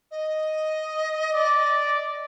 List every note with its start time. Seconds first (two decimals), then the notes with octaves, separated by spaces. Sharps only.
0.11 D#5
1.32 D5